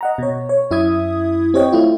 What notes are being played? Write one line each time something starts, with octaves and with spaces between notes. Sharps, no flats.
D#5 F#5 A#5
B2 C#5
C#5
F#2 E4 E5 D#6 G#6
C4 G4 C#5 D#5 G5
A3 E4 F4